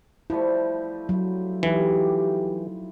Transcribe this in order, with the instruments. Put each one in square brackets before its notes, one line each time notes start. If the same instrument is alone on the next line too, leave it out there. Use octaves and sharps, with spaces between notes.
[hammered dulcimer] F3 G3 A3 [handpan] E4
[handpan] F#3
[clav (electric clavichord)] E3 [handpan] D#4 E4 [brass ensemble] G4